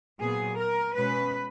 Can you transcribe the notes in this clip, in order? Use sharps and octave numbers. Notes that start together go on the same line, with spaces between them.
A#2 F#3 B3 G#4
A#4
B2 G#3 C#4 B4